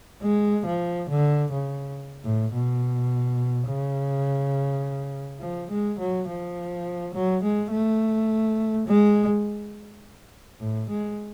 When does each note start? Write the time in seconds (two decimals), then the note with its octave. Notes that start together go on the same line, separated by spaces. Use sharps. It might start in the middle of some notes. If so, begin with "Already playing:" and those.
0.22 G#3
0.66 F3
1.09 D3
1.52 C#3
2.23 A2
2.53 B2
3.68 C#3
5.40 F3
5.70 G#3
5.99 F#3
6.28 F3
7.14 F#3
7.42 G#3
7.71 A3
8.87 G#3
10.60 A2
10.89 G#3